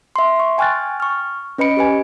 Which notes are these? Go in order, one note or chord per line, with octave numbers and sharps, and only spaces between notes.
E5 C6
C6 C#6
G5 G#5 C#6 F6 F#6 A6
C#6 F6
C#4 B4 D#5 B5 C#7 D7
G4 B4 G#5